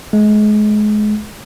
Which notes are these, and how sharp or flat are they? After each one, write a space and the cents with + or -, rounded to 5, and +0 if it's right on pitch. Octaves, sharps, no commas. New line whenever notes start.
G#3 +30